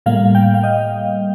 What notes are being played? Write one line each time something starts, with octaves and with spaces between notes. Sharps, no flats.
A2 G3 A#3 F5
G5
F5
D#5